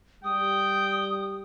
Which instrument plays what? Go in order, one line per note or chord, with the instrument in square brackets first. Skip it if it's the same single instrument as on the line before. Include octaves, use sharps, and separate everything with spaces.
[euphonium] G3 [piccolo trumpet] G5 [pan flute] D#6